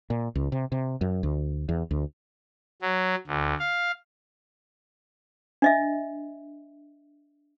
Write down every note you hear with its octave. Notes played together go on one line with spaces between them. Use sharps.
A#2
C#2
C3
C3
F#2
D2
E2
D2
F#3
D2
F5
D4 D#5 E5